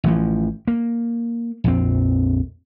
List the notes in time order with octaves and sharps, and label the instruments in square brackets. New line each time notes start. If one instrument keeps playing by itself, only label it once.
[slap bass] A1 E3 F3
A#3
A#1 F2 C4